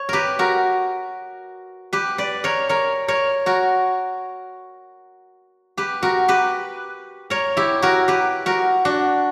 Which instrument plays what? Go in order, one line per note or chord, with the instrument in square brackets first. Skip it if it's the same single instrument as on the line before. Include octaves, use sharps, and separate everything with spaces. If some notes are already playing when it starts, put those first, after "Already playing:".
Already playing: [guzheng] C#5
G4 A#4 B4
F#4 A#4
G4 B4
B4 D5
A#4 C#5
A#4 C#5
A#4 C#5
F#4 A#4
G4 B4
F#4 A#4
G4 B4
A#4 C#5
E4 G4
F#4 A#4
G4 B4
F#4 A#4
D4 F#4